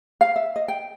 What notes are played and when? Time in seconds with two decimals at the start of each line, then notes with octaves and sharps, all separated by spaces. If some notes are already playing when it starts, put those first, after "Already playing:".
0.21 F5
0.36 E5
0.56 D#5
0.68 G5